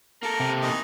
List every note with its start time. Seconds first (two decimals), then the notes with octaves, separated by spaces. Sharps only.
0.23 A#3 A4 A#4
0.40 C3
0.61 D#3 E3 D#4